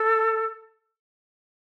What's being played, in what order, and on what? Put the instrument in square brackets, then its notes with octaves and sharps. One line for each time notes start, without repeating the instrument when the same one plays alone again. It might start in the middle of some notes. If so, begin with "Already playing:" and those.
Already playing: [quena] A4